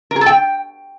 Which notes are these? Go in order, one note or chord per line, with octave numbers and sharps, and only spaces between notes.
A#4
G#4
A4
G5